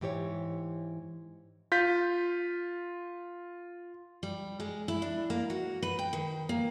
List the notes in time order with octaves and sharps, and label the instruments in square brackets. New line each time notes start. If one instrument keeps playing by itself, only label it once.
[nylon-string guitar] G#2 E3 G4 B4 C#5
[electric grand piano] F4 G6 B6
[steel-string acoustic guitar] G3
G#3
E4
D4
A#3
F#4
B4
G5
D#3
A#3